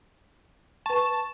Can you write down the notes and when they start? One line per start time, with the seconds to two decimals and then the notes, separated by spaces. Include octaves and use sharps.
0.86 B4 A5 C#6